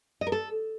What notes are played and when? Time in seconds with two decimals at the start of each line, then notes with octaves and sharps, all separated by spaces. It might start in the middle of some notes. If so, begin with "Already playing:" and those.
0.21 D#5
0.27 A#4
0.32 A4